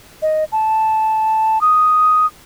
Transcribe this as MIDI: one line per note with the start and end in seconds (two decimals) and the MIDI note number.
0.22 0.44 75
0.52 1.61 81
1.61 2.26 87